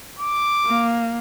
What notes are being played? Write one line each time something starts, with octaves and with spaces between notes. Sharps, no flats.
D6
A#3